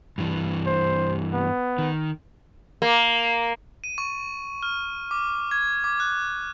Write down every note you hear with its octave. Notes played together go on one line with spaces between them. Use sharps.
G2 E3
C5
B3
D#3
A#3
D#7
C#6
F6
D6
G#6
D6
F#6